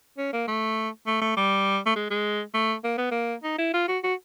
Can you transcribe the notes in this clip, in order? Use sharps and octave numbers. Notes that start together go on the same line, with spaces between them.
C#4
A#3
A3
A3
A3
G3
A3
G#3
G#3
A3
A#3
B3
A#3
D#4
E4
F4
F#4
F#4